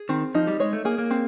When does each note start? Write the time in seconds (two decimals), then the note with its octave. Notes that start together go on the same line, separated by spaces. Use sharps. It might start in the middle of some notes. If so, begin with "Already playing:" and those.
Already playing: G#4
0.09 D#3 C4
0.35 F3 D#4
0.47 G3
0.60 G#3 C#5
0.73 A3
0.85 A#3 G#4
0.98 A#3
1.11 C4